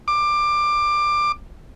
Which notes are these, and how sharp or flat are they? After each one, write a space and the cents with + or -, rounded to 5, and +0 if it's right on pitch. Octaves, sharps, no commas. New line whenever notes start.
D6 +20